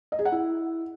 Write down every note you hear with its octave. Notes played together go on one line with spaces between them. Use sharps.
D#5
G#4
F#5
E4